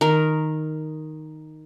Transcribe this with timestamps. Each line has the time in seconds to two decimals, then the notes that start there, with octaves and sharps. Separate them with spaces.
0.01 D#3 A#4